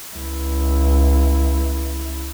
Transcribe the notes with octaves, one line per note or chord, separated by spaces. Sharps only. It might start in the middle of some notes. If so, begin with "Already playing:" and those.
C#2 E4